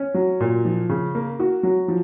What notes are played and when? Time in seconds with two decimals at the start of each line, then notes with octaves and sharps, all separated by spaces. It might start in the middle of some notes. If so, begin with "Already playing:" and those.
Already playing: C#4
0.14 F#3
0.40 A#2
0.65 F3
0.89 C#3
1.15 A#3
1.40 F#4
1.63 F#3
1.88 F3